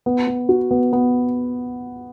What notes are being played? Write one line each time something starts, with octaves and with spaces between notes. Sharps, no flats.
B3
B3
F#4
B3
B3